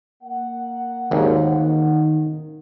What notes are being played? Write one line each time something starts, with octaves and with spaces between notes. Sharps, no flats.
A#3 F#5
G#1 D#2 D#3